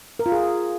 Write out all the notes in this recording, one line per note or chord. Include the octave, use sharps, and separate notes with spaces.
A#4
F4
G#4